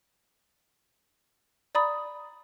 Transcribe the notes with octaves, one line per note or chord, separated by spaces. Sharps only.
D5 A#5 B5 D#6 A6